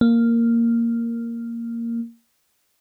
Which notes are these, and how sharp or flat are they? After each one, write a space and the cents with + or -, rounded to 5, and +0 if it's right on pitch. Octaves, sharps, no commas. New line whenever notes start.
A#3 -5